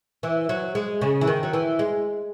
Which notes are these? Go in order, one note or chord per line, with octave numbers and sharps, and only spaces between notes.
E3
F#3
G#3
C#3
E3
D#3
F#3
E3
G#3